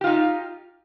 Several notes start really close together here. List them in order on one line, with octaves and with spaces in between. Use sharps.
G4 F4 D#4